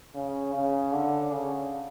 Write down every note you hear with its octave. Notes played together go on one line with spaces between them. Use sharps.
C#3
C#3
D3
C#3